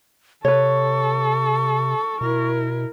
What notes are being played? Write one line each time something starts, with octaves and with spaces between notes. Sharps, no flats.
C3 A4 B4 C#5 C#6
B2 E4 A#4